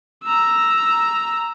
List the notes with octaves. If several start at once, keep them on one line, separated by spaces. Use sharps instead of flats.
A#5 E6